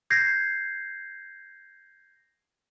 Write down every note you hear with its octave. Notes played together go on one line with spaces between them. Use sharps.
G6 G#6 A#6 C7